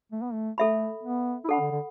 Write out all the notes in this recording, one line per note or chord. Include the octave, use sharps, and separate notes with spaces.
A3
B3
A3
A3 A4 E5 B5
B3
E4
D4 A4 F#5 B5
D3
D3